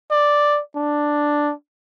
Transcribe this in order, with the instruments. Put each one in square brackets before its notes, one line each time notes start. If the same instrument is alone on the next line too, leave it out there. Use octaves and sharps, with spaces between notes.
[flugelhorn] D5
D4